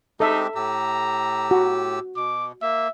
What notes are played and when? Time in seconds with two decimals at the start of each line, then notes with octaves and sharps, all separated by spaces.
0.20 G#3 C4 D#4 G4 A4 E5
0.55 A2 G4 A#5 E6
1.51 F#4
2.16 B2 D6
2.62 A#3 E5